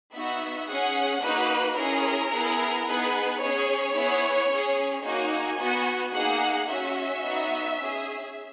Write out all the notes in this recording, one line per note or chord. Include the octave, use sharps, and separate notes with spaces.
B3 D#4 F#4 E5
C#4 G#4 F#5
A#3 D#4 F#4 B4
C#4 E4 G#4 A#4
B3 E4 G#4
B3 D#4 G#4 B4
C#4 G#4 C#5
B3 E4 G#4
C#4 G#4
A#3 D#4 F#4 G#5
B3 F#4
A#3 D#4 G#4 F#5
C#4 F#4 E5
B3 D#4 F#4
C#4 G#4